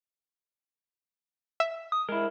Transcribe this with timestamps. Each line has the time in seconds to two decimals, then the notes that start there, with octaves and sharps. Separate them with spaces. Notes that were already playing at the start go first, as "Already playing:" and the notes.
1.60 E5
1.92 D#6
2.09 G#3 E4 A#4